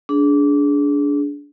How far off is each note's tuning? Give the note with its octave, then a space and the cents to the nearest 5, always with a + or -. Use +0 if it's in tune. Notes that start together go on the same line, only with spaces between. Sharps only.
D4 -25 G#4 +15